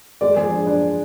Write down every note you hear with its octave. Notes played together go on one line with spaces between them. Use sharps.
G#3 D5
F3 G#4
D4
D4